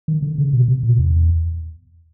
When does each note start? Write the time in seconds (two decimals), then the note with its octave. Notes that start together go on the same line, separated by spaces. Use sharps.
0.08 D#3
0.22 D3
0.38 C#3
0.53 B2
0.68 C3
0.83 A#2
0.99 E2